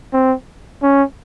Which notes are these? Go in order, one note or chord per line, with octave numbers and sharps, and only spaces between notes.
C4
C#4